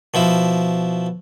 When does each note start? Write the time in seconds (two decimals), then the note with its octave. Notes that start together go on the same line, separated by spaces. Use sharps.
0.14 B2 F3 E4